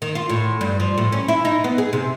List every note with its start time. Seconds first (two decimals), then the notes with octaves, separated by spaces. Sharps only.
0.02 D#3
0.15 F4
0.29 A2
0.61 G2
0.80 F3
0.98 A2
1.12 C#4
1.28 E4
1.45 D#4
1.64 B3
1.78 G#4
1.93 C3